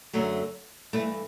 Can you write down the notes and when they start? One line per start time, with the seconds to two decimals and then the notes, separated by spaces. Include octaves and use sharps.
0.13 F#2 D3 F#3 A3
0.93 G2 E3 A3